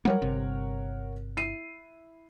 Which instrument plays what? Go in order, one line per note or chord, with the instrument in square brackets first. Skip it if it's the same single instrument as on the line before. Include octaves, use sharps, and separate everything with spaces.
[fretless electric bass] F#3 G3 A#3 [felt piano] A#4 C#5 F#5
[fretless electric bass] G1 C3
[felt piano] E4 C7 D#7